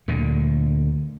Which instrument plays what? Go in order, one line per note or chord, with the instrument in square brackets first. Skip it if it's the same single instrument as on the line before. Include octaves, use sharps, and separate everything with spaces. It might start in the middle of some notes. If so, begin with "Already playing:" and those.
[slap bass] D2 A#2 D3